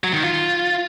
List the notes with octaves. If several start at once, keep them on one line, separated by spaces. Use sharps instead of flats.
F#3
D#3
F4